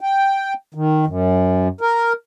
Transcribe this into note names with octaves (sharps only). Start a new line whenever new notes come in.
G5
D#3
F#2
A#4